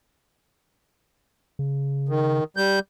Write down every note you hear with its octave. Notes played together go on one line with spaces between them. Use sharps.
C#3
D#3
G3 G6